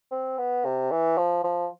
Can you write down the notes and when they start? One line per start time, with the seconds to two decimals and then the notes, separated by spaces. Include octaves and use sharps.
0.12 C4
0.38 B3
0.65 C3
0.91 E3
1.18 F3
1.44 F3